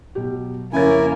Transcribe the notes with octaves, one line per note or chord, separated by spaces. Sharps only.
B2 F#3 G4
F2 C#3 A#3 C#4 E4 A#4 G#5 A6